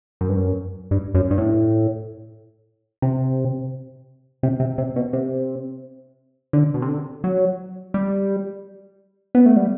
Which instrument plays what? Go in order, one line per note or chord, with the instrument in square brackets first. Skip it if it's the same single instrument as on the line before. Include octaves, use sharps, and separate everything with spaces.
[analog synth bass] F#2
G2
F#2
G2
F#2
G2
A2
C3
C3
C3
C3
B2
C3
D3
B2
C3
D3
F#3
G3
B3
A3
G3